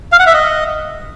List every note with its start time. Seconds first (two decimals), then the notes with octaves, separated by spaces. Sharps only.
0.12 F5
0.19 F#5
0.27 E5
0.34 D#5